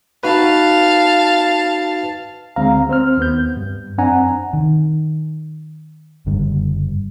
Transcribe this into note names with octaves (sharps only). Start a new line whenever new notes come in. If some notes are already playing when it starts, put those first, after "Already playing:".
D#4 F#4 B4 F5 A5
D2 D3 G#3 C4 F5 A#5
C4 C5 F6
D#2 B3 G6
G2
F#2 C4 D4 F#5 G#5 A#5
D#3
F#1 G2 D3